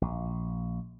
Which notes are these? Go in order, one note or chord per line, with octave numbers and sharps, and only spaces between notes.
A#1